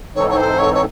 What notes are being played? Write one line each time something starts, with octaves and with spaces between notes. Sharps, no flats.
G#2 E3 C4 D#4 A4 C#5
C#5
C5
C#5
C#5